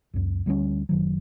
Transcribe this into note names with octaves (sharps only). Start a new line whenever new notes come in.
C#2 F#2
D2 G3 C4 C#4
F#1 D#3 F#3